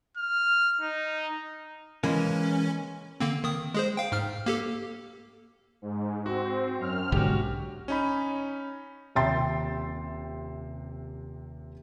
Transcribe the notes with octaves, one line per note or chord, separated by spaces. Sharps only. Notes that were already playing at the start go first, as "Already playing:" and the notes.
F6
D#4
E3 G#3 A#3 C#4
D3 A#3 C4
D#3 D#6
G#3 G#4 C5
F5 G5
G#2 F6
A#3 G4 A4
G#2
C4 F#4
F#2 F6
B1 G#2 D3 F#4 G4
C#4 D#4 B5
D#1 C3 E5 G5 C6 A6